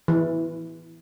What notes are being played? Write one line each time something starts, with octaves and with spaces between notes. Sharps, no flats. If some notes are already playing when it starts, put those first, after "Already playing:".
E3